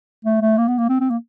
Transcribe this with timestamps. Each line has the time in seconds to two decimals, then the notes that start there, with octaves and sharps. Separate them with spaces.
0.25 A3
0.42 A3
0.58 A#3
0.68 B3
0.78 A#3
0.89 C4
1.00 C4
1.10 A#3